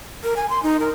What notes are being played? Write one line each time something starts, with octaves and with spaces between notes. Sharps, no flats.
A#4
G#5
C6
D#4
A#4